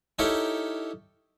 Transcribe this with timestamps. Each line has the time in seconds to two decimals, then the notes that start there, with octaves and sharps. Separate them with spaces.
0.19 D#4 E4 G4 A4 A#4 C#5